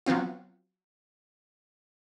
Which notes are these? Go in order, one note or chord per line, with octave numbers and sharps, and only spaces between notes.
F3 F#3 B3 C4 F4